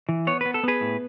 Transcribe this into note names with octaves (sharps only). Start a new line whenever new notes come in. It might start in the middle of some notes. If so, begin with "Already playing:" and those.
E3
B3 C#5
B3 B4
A4
B3 G#4 B4
A2